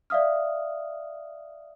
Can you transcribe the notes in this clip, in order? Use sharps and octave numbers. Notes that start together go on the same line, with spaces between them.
D5 E5 F5 D#6 F6